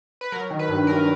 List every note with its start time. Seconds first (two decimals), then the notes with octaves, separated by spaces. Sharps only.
0.21 B4
0.32 F#3 A#4
0.51 D#3
0.59 B4
0.68 G2
0.87 G2 A#4